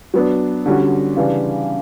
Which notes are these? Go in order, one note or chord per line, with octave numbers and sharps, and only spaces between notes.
F#3 B3 D4
D3 G3 C#4 F#4
C#3 E3 G3 D4